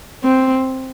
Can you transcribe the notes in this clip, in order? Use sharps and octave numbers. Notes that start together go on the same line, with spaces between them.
C4